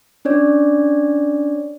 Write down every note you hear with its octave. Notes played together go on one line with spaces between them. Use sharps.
C#4 D4 C#5 D5